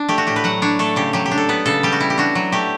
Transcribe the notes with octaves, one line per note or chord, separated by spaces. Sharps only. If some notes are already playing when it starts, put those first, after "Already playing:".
Already playing: D4
A3 G4
F#4
A2 G4
B4
F#3 F#5
D4 C#5
A3 A4
C#3 G4
F#3 G4
G4
D4
A4
B3 B4
C#3 A4
G3 G4
F#4
E4
G4
D4 F#4
F#3
A3 G4